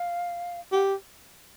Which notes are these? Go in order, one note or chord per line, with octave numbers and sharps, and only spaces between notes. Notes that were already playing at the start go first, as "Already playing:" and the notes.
Already playing: F5
G4 F#5